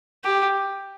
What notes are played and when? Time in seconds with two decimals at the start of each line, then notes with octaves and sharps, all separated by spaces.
0.24 G4